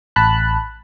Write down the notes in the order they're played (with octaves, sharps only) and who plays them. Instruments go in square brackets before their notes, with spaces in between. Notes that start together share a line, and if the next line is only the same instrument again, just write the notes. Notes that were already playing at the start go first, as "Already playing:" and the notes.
[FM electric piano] A1 A5 B5 F#6